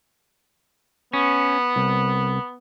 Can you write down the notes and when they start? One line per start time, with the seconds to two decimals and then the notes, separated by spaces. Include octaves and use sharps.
1.13 B3 C#4
1.76 C2